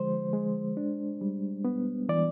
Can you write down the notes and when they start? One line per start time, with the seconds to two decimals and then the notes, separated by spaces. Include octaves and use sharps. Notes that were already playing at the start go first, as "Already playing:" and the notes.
Already playing: D3 F3 G#3 C5
0.33 G#3
0.77 D4
1.21 G3
1.65 B3
2.09 E3 D5